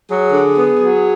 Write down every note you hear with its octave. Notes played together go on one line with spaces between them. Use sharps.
F#3 G#4
D3
B3
F#3